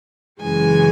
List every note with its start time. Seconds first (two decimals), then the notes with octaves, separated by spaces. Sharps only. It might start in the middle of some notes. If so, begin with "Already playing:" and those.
0.42 F#2 C#3 E3 G#3 G#5